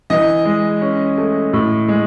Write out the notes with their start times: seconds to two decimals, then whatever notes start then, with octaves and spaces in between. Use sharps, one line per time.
0.10 E3 D#5
0.45 G#3
0.82 C#4
1.17 A3
1.53 A2
1.88 G#3